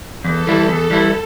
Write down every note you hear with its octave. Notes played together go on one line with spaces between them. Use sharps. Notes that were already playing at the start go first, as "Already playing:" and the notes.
E2 A4
E3 G3 E4
E2 A4
E3 G3 E4